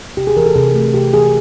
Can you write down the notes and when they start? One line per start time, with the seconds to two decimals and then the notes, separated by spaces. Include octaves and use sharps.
0.17 C3 G4
0.27 G#4
0.37 E3 A#4
0.46 A4
0.56 C3 G#4
0.74 A3
0.94 C3 G4
1.13 E3 G#4